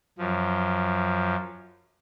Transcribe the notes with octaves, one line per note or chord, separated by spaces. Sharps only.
F#2 F3